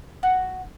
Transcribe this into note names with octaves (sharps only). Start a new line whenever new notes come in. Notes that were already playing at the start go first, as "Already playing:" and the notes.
F#4